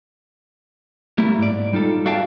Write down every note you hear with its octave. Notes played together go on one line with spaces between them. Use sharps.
G3 A3 A#3 E4
G#2 D5
G3 D#4 F4 A4
F#4 D5 E5 F5 G5 A5